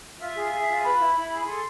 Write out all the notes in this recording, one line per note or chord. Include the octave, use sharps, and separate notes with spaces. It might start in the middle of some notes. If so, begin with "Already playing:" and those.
F4 E5
G#4
G#4
F4
B4 B5
E4
E4
G#4
A4 C6